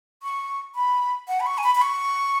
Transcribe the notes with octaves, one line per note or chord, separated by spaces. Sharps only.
C#6
B5
F#5
B5
C#6
G#5
B5
B5
C#6